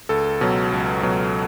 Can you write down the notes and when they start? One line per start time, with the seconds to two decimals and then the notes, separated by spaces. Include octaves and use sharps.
0.09 C#2 A4
0.41 B2 F#3
0.72 C#2
1.03 B2 F#3